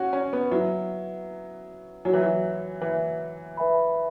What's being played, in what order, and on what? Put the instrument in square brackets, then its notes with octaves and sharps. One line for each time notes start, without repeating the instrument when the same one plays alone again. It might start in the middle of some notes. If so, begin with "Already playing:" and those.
Already playing: [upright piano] C#4 F#4
C#4
B3
[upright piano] F#3 [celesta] E4 B4 E5
[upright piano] F#3 [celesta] F#4 C#5 G#5
[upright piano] E3
F#3
E3
[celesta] B4 E5 G#5 B5